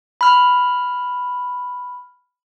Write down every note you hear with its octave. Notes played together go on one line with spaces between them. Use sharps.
B5 F6